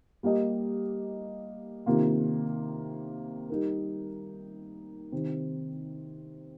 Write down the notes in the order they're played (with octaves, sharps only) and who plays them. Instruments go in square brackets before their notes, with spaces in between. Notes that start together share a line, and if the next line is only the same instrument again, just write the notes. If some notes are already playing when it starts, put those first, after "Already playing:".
[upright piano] G3 A#3 G4 D#5
C3 D#3 A#3 F4
G3 D#4 A#4
C3 D#3 C4